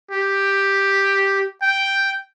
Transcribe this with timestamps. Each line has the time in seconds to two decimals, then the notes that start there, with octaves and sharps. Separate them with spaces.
0.11 G4
1.62 G5